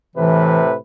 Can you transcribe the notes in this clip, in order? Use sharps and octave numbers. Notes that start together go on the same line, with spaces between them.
A2 C3 E3 B4